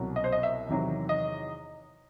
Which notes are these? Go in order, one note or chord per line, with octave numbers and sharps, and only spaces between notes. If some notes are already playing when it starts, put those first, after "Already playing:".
Already playing: C2 B2 F#3
D#5
C5
D#5
E5
E2 C3 D#3 F#3
D#5